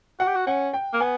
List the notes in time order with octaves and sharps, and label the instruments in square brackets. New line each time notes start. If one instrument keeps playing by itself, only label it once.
[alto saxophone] F#4 [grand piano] F#5
[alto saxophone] G4
F#4
[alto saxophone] C#4 [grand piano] F#5
[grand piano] G5
[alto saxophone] A#3
[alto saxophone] B3 [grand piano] G#5